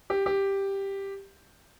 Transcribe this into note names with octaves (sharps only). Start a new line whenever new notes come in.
G4
G4